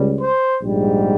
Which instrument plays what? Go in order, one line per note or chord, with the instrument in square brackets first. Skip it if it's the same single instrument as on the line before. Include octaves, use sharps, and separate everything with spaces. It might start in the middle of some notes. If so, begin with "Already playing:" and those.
Already playing: [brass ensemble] C#2 C#3 G3
C5
A#1 G#2 G3